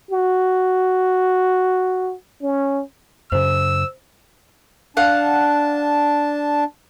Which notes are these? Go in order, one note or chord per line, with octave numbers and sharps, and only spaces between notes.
F#4
C#4
F#2 C#3 C5 E6
D4 F5 F#5 A5